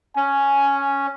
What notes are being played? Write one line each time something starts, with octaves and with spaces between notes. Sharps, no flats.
C#4 G#5